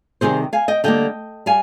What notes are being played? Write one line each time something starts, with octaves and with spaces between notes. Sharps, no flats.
C3 D#3 G3 G#4 C5
F5 G#5
D#5 G5
D3 G3 A#3 D#5 G5
G3 F5 G#5